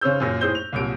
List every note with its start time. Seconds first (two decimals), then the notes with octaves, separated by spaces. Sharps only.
0.01 C#3 C#4 C5 E6 G6
0.20 F#2 A#2 A#6
0.41 A2 G#4 C5 G6 G7
0.55 F7
0.73 C2 A#2 F#3 D7